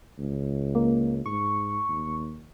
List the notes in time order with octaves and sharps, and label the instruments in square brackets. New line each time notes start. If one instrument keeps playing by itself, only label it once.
[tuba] C#2
[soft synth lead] A#3
[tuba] G#2 [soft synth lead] C#6
[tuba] D#2